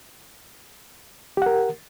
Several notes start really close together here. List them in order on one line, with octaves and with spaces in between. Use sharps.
G4 F#5 A#4